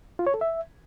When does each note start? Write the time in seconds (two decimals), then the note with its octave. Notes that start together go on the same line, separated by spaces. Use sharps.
0.19 F4
0.27 C#5
0.34 A4
0.41 E5